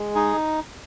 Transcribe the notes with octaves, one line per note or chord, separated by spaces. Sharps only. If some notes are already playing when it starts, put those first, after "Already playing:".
Already playing: G#3
D#4 G#4